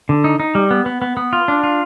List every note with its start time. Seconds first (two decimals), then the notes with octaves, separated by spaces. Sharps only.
0.09 D3
0.24 D#4
0.40 D#4
0.55 G3
0.71 B3
0.86 B3
1.02 B3
1.17 B3
1.33 F4
1.48 D4
1.63 F4